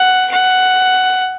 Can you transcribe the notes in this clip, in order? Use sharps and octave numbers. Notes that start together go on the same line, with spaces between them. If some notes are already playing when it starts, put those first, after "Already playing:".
Already playing: F#5
F#5